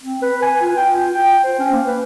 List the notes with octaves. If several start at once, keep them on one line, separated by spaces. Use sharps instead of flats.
C4
B4
G#5
F4
G5
F4
G5
C5
C#4
A#3
B4